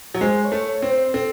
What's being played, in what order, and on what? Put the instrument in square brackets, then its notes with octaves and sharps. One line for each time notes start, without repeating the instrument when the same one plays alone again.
[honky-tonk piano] F#3
[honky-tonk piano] G#3 [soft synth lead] C5
[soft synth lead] C#5
[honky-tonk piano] A3
[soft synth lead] C#5
[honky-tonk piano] C4
[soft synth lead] C5
[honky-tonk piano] C4 [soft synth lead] A4